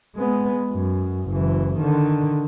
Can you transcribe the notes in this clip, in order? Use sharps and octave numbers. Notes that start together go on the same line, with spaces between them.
G#3 B3
F#2
F#1 E3
D3 D#3